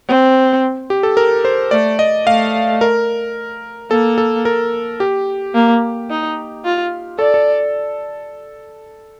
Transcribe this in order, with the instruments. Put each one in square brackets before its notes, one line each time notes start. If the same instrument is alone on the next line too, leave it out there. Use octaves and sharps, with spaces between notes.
[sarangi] C4
[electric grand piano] G4
A4
A#4
C5
[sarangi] A3 [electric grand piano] D5
[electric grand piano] D#5
[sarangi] A3 [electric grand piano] F5
[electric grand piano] A#4
[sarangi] A#3 [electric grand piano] A4
[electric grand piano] A4
A#4
G4
[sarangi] A#3
D#4
F4
[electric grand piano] A4 [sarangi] D5
[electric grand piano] A4